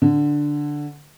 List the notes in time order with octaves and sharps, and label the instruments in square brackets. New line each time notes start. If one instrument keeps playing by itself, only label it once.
[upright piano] D3